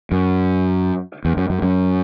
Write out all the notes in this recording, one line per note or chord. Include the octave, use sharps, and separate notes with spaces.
F#2
E2
F#2
F#2
F#2